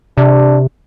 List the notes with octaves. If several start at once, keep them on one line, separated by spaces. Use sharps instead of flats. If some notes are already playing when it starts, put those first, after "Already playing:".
C3 D4